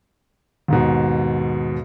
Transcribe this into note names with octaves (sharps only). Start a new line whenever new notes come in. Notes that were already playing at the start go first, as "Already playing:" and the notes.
D#2 G#2 B2